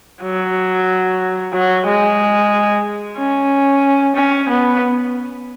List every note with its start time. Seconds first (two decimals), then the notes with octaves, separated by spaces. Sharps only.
0.23 F#3
1.53 F#3
1.86 G#3
3.18 C#4
4.15 C#4
4.49 B3